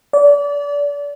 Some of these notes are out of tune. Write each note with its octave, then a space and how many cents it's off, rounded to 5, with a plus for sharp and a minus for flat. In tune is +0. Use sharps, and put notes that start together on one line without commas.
D5 -30